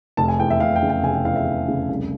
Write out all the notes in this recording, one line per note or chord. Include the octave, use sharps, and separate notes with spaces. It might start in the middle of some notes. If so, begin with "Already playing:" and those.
F1 A5
G#5
E2 G5
E5
F1 F5
G5
C#3
G5
F1 G#5
G5
E2 F5
E5
F1
C#3
C2